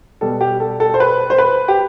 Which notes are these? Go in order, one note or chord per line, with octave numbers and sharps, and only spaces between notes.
B2 G3 A4
G4
A4
A4
C5
B4
C5
B4
G4